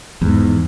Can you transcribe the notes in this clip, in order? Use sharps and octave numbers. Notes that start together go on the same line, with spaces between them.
E2 G#2